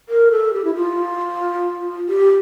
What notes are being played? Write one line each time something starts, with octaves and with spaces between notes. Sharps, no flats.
A#4
A4
G4
E4
F4
G4